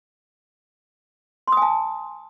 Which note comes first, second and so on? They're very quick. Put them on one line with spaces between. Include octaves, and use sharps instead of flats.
C6 D#6 G#5 A5